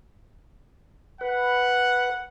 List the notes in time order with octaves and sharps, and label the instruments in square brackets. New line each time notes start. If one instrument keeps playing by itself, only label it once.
[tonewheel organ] B4 [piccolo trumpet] F#5